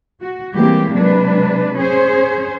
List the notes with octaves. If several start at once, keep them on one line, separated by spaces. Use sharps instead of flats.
F#4
E3 G3 G#3 A#3 C4 G4
C3 F#3 G#3 D4 B4
C#4 G#4 C5